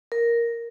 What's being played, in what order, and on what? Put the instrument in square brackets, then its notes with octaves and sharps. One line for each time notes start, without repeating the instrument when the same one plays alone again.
[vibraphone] A#4